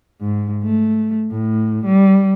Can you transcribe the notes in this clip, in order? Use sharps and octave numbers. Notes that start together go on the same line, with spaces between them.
G#2
A3
A2
G3